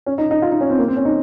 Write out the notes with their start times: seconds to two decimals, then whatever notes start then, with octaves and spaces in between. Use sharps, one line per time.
0.06 C#4
0.18 D#4
0.31 D#4
0.42 F4
0.52 D#4
0.61 C#4
0.70 C4
0.79 A#3
0.88 C4
0.97 C#4
1.05 D#4